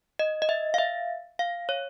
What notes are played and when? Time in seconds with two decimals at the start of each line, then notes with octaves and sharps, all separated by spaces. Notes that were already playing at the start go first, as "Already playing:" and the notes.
0.19 D#5
0.42 D#5
0.49 E5
0.74 F5
0.78 E5
1.39 F5
1.69 C#5